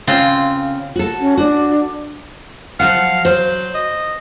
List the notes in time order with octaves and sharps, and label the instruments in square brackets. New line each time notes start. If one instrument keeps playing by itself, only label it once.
[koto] C#3 C4 F4
[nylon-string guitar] F#4 A4
[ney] C#4
[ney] D4 [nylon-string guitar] F#4
[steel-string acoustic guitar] F3 F#3 F#5 [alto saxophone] F5
[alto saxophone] F#3 [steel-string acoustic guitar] C5
[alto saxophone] D#5